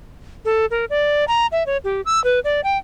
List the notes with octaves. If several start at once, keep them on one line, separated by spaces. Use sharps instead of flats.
A4
A#4
D5
A#5
E5
C#5
G4
E6
B4
D5
G5